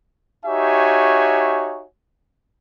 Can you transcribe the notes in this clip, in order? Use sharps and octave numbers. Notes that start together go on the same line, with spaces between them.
D#4 F#4 G4 C#5 E5 G#5